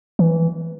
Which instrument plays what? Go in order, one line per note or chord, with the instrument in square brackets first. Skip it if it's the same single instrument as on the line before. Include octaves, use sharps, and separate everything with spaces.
[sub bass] E3